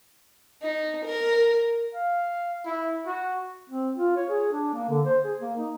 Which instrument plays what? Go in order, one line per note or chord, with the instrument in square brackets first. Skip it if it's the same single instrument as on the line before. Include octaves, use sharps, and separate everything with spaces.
[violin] D#4
A#4
[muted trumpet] F5
E4
F#4
[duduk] C4
F4
C#5
G#4
D4
A#3
D3
C5
G#4
A#3
D#4